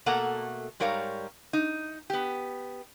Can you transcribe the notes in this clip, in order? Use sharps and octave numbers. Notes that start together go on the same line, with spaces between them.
B2 A3 A#3 A4 F#5 A#5
G#2 G3 A#4 C#5 F5 A#5
D#4
B3 G4